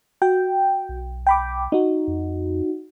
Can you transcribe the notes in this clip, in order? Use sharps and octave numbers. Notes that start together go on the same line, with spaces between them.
F#4 G5
B1
G5 B5 D6
D#4 F#4
F2